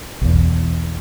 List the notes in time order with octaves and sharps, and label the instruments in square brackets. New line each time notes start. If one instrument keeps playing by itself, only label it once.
[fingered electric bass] B1 E2